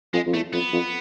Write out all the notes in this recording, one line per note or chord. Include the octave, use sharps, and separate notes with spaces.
F2 G#3
F2
E2 A3
F2 B3
F2